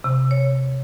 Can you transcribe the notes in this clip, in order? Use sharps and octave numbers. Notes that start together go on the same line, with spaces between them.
C3
C#5